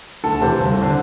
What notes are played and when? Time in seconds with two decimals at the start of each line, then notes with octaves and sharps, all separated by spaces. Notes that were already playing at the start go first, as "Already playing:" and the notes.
0.24 D2 A4
0.41 C3 E3 C5
0.60 G1
0.82 D3